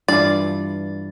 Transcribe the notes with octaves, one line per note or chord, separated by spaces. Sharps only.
G2 E3 F4 D5 A6